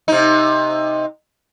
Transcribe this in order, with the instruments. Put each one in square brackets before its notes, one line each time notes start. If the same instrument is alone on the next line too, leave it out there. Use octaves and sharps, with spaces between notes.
[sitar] C3 D#4